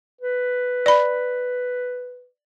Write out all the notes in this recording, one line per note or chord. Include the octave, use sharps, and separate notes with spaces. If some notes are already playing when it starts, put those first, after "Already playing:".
B4
D5 B5